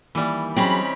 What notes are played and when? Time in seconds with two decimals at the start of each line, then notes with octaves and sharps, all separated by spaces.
0.15 D#3 E3 G3 A#3
0.56 F#3 C4 C#4 D#4 G#4 B5